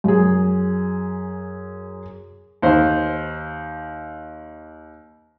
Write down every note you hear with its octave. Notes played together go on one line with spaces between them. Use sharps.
F#2 G#4
D#2 C5